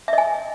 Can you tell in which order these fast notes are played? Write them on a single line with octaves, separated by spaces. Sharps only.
E5 D#5 G#5